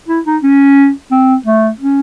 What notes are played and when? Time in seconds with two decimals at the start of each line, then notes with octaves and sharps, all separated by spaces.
0.08 E4
0.26 D#4
0.43 C#4
1.11 C4
1.46 A3
1.80 C#4